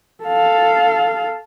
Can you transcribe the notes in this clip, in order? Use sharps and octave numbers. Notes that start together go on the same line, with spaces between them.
A4 F5